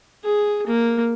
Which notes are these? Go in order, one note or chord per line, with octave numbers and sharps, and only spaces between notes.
G#4
A#3